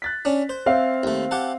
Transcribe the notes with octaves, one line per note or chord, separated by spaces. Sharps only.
F#6 A6 B6
C#4 D4
C5
C4 E5 F5
D#2 A3
G4 F#5 A5